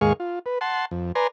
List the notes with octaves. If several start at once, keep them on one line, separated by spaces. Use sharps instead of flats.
D#2 G#2 G#3 G#4 F5 C#6
F4
B4
F#5 A5 C6
F2
B4 D5 G#5 A#5 C6